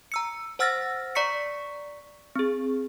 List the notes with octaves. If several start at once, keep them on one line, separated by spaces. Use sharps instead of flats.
A#5 E6 C#7
C5 F#5 E6 F6 A6 A#6
D5 A#5 C#6 B6 C#7
C4 G#4